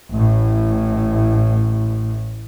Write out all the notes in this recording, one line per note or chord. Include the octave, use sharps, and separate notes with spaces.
A1 A2